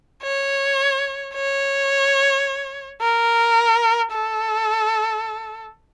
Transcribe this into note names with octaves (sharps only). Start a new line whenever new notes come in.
C#5
C#5
A#4
A4